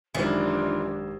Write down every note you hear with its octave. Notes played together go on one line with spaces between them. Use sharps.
G#1 F#2 E3 D4 D#4 F4 G4 C5